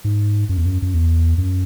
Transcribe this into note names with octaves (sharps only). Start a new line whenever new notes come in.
G#2
F#2
E2
F#2
F#2
E2
F#2